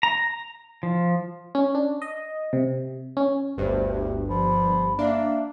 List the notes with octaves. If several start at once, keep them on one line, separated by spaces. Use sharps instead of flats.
A#5
F3
C#4
D4
D#5
C3
C#4
G1 D2 G2 C5
G4
F3 B5
A#3 D4 E5